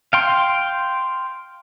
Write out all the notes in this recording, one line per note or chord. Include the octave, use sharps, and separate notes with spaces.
F5 G5 C6